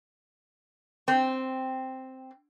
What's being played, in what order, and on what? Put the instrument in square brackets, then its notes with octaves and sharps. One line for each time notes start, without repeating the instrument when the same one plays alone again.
[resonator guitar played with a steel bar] C4 [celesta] G5